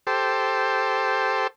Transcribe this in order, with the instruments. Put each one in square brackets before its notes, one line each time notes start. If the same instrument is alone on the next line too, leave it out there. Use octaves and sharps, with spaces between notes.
[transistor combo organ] G4 A4 C5